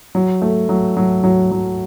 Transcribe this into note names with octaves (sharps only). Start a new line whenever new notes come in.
F#3
A3
F#3
F#3
F#3
F#3